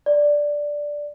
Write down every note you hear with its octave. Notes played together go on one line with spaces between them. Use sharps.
D5